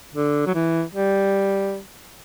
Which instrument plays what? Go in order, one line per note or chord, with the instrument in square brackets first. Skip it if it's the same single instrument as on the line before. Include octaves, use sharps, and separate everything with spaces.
[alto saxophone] D3
F#3
E3
G3